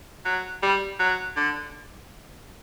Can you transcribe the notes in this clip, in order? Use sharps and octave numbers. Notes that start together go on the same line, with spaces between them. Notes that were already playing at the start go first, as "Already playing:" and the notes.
F#3
G3
F#3
D3